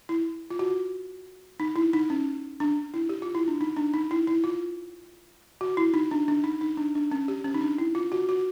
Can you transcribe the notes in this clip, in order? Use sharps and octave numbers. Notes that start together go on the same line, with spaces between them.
E4
F4
F#4
D#4
E4
D#4
C#4
D4
E4
G4
F4
E4
D4
D#4
D4
D#4
E4
E4
F4
F#4
E4
D#4
D4
D4
D#4
D#4
D4
D4
C#4
G4
C#4
D#4
D4
E4
F4
F#4
F#4